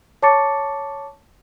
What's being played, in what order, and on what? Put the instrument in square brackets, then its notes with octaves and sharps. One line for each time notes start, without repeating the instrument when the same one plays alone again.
[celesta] C#5 A5 C#6 D6 A6 C#7